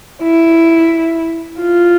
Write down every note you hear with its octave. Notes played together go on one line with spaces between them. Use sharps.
E4
F4